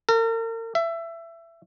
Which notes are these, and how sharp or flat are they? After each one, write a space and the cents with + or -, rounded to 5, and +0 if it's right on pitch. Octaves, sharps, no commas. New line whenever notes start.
A#4 -40
E5 +20